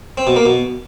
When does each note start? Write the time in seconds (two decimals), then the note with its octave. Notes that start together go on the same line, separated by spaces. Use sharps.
0.18 C4
0.27 B2
0.36 A#3
0.46 B2